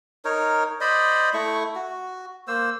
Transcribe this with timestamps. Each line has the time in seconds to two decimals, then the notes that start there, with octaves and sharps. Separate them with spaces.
0.25 D#4 A#4 C#5
0.81 C5 D5 D#5 B5
1.34 A3 E4 C#6
1.75 F#4
2.48 A#3 C5 E6